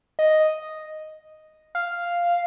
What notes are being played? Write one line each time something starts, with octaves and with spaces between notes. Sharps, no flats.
D#5
F5